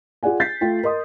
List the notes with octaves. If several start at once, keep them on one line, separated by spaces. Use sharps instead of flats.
F4 G#4 D5 F#5 G#5
G6 A6 B6 C7
A3 F4 G5
A#4 D#5 C6 D#6